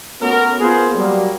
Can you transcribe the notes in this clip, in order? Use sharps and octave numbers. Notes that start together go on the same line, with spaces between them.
A3 B3 C#4 F#4 A#4
A#3 B3 F4 G#4 B4 C5
F#3 G3 A#3